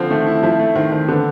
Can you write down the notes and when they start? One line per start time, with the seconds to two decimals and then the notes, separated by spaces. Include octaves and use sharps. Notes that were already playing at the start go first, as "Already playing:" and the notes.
Already playing: D3 F3 C4
0.10 D#3 A3
0.27 E4
0.43 F3 E4
0.59 A3
0.75 D#3 C4
0.92 D#3 C4
1.08 D3 B3